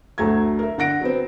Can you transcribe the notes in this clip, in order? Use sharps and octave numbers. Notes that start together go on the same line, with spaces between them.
D2 F#3 A3 A#5 G#6
A#4 E5
D3 F#5 A#6 D7
F#3 B3 C4